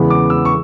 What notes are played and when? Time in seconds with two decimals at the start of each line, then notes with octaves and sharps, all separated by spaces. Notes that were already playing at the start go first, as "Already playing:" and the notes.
Already playing: E2 C#3 E3 G#3 B3
0.10 D6
0.30 E6
0.45 C#6